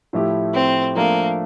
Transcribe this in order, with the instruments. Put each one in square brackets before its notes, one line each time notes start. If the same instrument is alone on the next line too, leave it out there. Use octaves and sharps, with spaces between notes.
[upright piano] A2 F3 A3 E4 G4
[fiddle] C4
[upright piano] F3 A3 D4 [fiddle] A#3